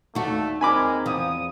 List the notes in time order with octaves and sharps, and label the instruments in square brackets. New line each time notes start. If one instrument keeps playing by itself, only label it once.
[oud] D#2 F#4 [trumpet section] A3 [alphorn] D4
[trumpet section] G#3 A#4 [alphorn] C4 [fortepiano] G#5 B5 D6
[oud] E2 F3 [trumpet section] D#6